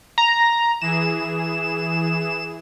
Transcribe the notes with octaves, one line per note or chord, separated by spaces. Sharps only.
A#5
E3 G#4 E7